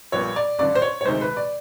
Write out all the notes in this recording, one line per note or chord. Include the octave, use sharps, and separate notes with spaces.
A#1 A#2 G3 B3 C#5
D5
A1 G2 D3 D5
C5
C#5
C#5
D2 C3 D#3 G#3 C5
B4
D5